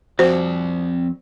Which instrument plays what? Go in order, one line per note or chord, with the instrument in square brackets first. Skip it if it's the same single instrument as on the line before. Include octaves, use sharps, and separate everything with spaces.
[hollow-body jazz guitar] F2 [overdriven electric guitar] C4 D5 [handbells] F#4 [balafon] C5